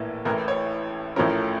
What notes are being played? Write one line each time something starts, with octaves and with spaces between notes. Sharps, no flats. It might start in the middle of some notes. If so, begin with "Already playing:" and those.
Already playing: A#1 A2 E3 A#3
A1 A2 E3 A#4
C#5
A1 A2 F3 A3 C#4 A#4